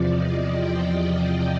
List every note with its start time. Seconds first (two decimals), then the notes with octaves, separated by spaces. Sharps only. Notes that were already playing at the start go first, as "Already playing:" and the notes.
Already playing: E2 C3 F3 D5
0.11 D#5
0.52 G5
0.95 G5